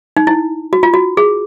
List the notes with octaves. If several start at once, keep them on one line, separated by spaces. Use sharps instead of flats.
D#4
E4
F#4
F4
F#4
G#4